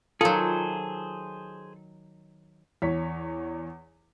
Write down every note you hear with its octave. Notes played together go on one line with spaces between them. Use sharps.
D#3 F#3 F4 G#4 A4 C5
E2 C#5 B6